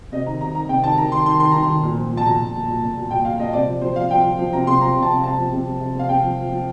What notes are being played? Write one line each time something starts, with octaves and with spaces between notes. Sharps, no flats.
C3 D#5
D#3 A#5
C3 A#5
D#3 A#5
C3 G5
D#3 A5
D#3 A#5
D#3 C6
D#3 C6
D#3 C6
D#3 A#5
C6
D#3
A#2
F3
F3
A5
A#2 A#5
A#2
A#2
A#2
A#2
A#2
A#2 G5
A#2 F5
A#2 D#5
C3 D5
F3
F3 C5
F3 F5
F3 G5
F3
F3
C3 A#5
C3 C6
F3 A#5
C3
A5
C3
C3 A5
F3
C3
F3
C3
C3 F5
C3 G5
F3
F3
F3